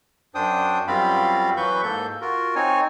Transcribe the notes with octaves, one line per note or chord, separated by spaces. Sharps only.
F#2 D4 C5 G5 D#6
F#2 G3 C4 F4 F5 B5
E3 F#3 B4 B5 C#6 G6
G#2 A#3 A4 G6
F4 F#4 A#4
C4 D#4 C#5 G#5